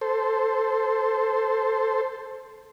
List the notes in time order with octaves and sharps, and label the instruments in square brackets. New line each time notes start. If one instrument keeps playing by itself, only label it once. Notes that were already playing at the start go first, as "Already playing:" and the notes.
[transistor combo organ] A4 C5